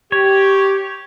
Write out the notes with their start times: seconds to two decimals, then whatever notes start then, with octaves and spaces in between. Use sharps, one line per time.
0.12 G4 C#5